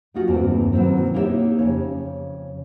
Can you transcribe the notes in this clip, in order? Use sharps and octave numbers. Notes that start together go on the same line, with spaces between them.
F#3 A#3 D#4 F4 F#4
E2 G2 C3 D#3 A#3 C4
B2 D#3 F#3 A#3 C4 E4
A#3 D#4 E4 G4 C#5 E5
F2 C#3 C#5